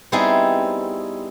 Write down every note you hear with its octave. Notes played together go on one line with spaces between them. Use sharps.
G3 B3 C4 D#4 E4 G#4